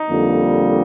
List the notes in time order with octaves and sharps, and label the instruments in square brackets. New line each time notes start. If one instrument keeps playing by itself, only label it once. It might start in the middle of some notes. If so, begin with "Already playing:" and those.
Already playing: [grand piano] D#4
[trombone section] F2 D3 G3 A#3